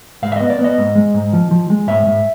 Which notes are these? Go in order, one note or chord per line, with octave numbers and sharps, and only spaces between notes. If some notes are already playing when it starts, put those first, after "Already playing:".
G#2 F5
E5
B3 D#5
D5
B3
D#5
G#2
G#3
G#2
F3
F3
G#3
G#2 E5
G#2